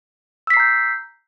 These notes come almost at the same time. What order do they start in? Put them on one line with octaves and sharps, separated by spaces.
E6 B6 C7 A#5 G6